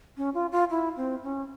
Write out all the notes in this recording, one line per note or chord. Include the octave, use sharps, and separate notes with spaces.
C#4
F4
F4
E4
C4
C#4